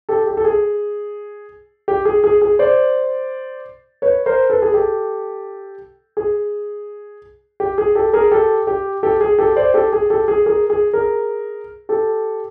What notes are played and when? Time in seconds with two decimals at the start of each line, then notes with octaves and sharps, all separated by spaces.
0.09 G4 A4
0.27 G4
0.37 A4
0.45 G#4
1.88 G4
2.05 G#4
2.24 G#4
2.41 G#4
2.59 C5 D5
4.02 B4 C#5
4.26 A#4 C5
4.50 A4 B4
4.62 G#4
4.74 G4 A4
6.17 G#4
7.60 G4
7.78 G#4
7.95 G4 A4
8.13 G#4 A#4
8.31 G4 A4
8.67 G4
9.03 G4 A4
9.21 G#4
9.39 G4 A4
9.56 C5 D5
9.74 G4 A4
9.93 G#4
10.10 G4 A4
10.28 G#4
10.46 G#4 A#4
10.70 G#4
10.93 G#4 A#4
11.89 G4 A4